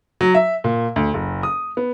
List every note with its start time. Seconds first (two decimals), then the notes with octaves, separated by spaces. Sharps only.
0.21 F#3
0.35 E5
0.64 A#2
0.96 D2
1.14 F#1
1.43 D#6
1.77 B3